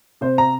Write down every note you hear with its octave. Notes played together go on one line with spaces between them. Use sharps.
C3 C5
A#5